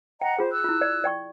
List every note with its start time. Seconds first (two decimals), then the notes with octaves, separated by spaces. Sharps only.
0.21 D#5 F#5 G5 A#5
0.39 F4 G#4 C5
0.51 E6 F#6
0.64 E4 F4
0.81 D5
1.04 D5 G5 C#6